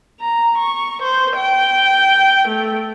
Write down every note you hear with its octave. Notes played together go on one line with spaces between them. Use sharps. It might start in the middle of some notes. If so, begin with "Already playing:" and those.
A#5
C#6
C5
G5
A3